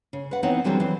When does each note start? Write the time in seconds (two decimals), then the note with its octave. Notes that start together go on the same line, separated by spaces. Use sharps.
0.13 C#3
0.31 B4 F#5
0.43 E3 B3 C4 D#4 C#5 F#5
0.64 D3 E3 F#3 G3 C4
0.80 E3 C4